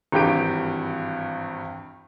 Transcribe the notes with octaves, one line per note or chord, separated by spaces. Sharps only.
G#1 G2 E3 G4 G6 D7